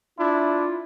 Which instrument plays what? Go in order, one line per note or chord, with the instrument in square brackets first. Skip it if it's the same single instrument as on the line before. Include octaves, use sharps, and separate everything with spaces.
[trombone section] D4 E4 [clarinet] F4